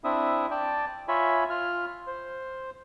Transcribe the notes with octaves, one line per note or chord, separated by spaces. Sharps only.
C4 D4 E4 E5 D#6
D5 G5 A5
F4 C#5 E5 G#5 B5
F4 F6
C5